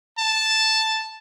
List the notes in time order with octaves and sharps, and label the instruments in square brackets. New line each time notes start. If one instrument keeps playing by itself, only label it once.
[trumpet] A5